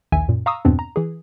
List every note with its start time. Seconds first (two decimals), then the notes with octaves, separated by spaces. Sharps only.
0.12 A#1 D#2 D#3 E5 G#5
0.28 F#2 A#2
0.46 F5 A#5 C#6 D#6 E6
0.65 E2 G2 B2 B3 C4 D4
0.79 A#5
0.96 E3 G#4